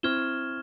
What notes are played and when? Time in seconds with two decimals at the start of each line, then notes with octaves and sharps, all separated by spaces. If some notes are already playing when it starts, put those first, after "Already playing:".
0.03 C4 E4 C#6 F6 G#6 E7 G7